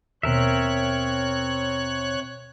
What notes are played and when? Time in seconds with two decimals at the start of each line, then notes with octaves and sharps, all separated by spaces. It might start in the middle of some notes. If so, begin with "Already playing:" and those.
0.23 D#2 B2 C4 A#4 C#5 E5 F#6